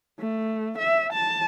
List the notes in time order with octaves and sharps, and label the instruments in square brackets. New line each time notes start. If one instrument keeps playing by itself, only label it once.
[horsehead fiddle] A3
E5
A5